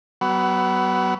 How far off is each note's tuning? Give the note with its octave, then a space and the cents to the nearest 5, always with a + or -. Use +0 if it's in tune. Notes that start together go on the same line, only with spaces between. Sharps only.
F#3 +30 B3 +0